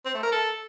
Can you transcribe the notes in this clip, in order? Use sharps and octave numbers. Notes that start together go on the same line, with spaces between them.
C4
A3
A#4
A4